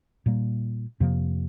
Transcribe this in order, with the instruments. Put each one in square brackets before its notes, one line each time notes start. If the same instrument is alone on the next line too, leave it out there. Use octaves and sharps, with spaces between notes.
[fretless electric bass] A#2 G3 A#3
F2 C3 F3 A#3